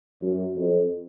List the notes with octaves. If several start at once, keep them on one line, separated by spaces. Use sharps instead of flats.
F#2
F2